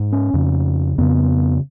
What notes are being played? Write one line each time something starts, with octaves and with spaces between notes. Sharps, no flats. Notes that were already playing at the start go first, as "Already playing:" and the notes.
Already playing: G#2
C#4
F2 C#3
F2 C#3 B3